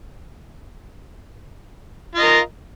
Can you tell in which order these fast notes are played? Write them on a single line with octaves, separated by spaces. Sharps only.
F4 D#5 A#4